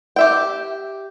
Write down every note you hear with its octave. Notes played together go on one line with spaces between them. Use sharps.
G4 E5 G5